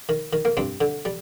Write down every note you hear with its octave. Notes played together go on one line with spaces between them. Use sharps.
D#3
D#3
A#3
G2 C4
D3
G3